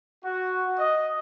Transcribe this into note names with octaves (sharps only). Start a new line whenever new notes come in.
F#4
D#5